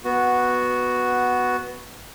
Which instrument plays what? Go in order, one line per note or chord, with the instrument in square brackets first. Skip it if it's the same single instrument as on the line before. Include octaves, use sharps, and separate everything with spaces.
[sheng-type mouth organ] B3 F#4